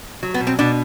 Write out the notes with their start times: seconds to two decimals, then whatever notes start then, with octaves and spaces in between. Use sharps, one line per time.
0.23 F#3
0.34 B3
0.41 B2
0.47 C4
0.59 B2 D4